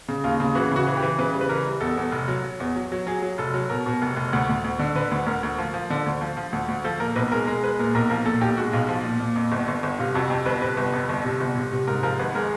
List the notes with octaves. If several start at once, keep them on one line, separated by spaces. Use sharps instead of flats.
C#3
D#2 F4
C#3
E3 F#4
C#3 F#4
E3
G4
E3
C#3 B4
G3
B4
E3 A#4
G3
E2 A4
E2
F1
F#3
F#3
E2
F#3
F#3
F#3 G#4
F#3
F1 A4
F#3
B2 A#4
B2
F1
F1
D2
D2
D2
D3
D3 B4
D2
D2 A#4
D2
F3
F3
D3
D2
F3
F3
D2
D2
F3 A4
A#2 A#4
B1 B4
G#3 A#4
G#3 A#4
G#3 B4
A#2 A#4
B1 A#4
F3 A#4
A#2 A4
B1 G4
G#3 F#4
B1 F4
F3
A#2
A#2
F2
G1
G1
G1
C3 F4
F2 F#4
F2 G4
G1 B4
C3 B4
G1
F2
G1
C3
G1
C3
C3
G#2 A#4
F3 A#4
G#1 B4
G#3 A#4